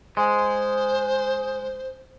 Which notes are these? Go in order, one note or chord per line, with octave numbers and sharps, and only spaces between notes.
G#3 C5